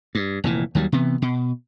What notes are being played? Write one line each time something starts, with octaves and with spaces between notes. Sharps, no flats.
G2
F1 A#2 E3
D#2 D#3 F#3 G3
C3 E3 B3
B2